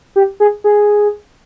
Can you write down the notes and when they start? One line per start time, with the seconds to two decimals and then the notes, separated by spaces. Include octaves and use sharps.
0.16 G4
0.40 G#4
0.64 G#4